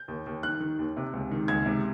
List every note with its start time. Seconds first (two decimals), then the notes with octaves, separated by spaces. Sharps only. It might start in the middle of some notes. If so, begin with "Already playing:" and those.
Already playing: G6
0.08 D#2
0.26 D#2
0.43 D#3 F#6
0.60 D#3
0.79 D#2
0.97 C3
1.13 C#2
1.31 D#3
1.48 C#2 G#6
1.66 C3